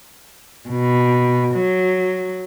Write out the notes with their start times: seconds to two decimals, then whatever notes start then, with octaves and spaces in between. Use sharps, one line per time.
0.69 B2
1.55 F#3